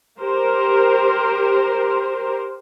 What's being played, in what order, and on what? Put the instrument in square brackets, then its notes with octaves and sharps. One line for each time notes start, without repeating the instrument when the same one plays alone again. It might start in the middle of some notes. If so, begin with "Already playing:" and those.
[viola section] G4 A#4 C5